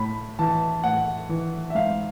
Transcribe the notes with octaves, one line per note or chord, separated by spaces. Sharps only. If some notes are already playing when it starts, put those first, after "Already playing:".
Already playing: A2 B5
E3 A5
A2 F#5
E3
E5
G#2 F5